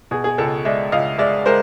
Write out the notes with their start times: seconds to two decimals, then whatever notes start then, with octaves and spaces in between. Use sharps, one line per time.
0.11 B2 G#4
0.24 G#4
0.38 C#2 A4
0.65 G#3 D5 E5
0.92 C#2 D#5 F5
1.18 G#3 D5 E5
1.46 G#3 A#4 C5